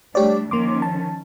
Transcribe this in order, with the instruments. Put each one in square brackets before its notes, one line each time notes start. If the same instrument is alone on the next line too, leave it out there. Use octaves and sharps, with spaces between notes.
[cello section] G3 A3 D4 [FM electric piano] G4 C#5 D5
[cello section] D#3 F3 C#4 [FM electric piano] A#3 C6 D6
[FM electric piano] A5